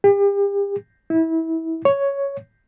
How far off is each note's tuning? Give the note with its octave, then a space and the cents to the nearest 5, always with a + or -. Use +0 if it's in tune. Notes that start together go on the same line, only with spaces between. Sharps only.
G4 +40
E4 -25
C#5 +5